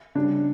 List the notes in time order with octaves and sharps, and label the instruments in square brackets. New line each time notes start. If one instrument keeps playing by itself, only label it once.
[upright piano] C#3 G3 D4